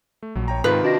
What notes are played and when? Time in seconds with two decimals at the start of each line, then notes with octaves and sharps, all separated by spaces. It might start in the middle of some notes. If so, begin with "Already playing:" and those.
0.23 A3
0.35 A#1 F#3
0.48 C#5 G5 A#5
0.64 G#2 C3 D#3 F4 B4
0.84 D4 F#4 D#5 A#6